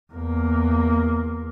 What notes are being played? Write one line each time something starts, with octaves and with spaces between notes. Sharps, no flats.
E2 A#3